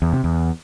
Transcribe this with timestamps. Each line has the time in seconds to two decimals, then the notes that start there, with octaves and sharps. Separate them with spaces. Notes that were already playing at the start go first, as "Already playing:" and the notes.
0.02 E2
0.13 C3
0.24 E2